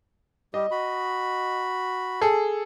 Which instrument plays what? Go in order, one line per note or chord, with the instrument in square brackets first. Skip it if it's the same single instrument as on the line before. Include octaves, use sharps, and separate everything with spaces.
[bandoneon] G3 G4 [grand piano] D#5
[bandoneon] F#4 B5
[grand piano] G#4 A4